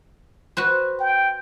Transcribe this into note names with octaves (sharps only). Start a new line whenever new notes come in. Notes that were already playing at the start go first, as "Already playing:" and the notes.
F#4 B4 C5
G5